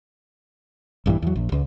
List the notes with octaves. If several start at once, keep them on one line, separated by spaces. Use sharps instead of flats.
A#1 G2 D#3 E3
E2 F#3
A#1
C#2